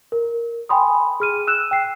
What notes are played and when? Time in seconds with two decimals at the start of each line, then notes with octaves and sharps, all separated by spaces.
0.12 A#4
0.69 G5 G#5 B5 C6 D#6
1.20 G#4 F6 D#7
1.47 E6 F#6 E7
1.71 G5 C7